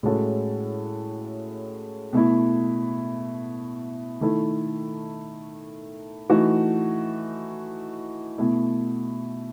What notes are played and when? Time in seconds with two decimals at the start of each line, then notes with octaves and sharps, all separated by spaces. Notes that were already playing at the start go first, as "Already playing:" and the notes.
0.03 A2 G#3 C#4 F#4 A4
2.13 B2 A3 E4
4.21 D#3 A3 E4 A4
6.30 E3 A3 D#4 F#4
8.38 B2 A3 E4